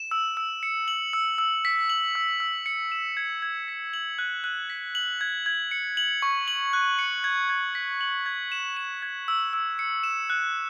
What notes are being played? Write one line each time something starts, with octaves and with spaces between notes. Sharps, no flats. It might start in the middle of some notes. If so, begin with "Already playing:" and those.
Already playing: E7
E6
E6
C#7
F#7
E6
E6
B6
F#7
E6
E6
C#7
E7
G#6
G#6
B6
F#7
F#6
F#6
B6
F#7
G#6
G#6
C#7
F#7
C#6
F#7
F#6
C#7
G#6
G#6
B6
F#7
G#6
E7
E7
G#6
E6
E6
C#7
E7
F#6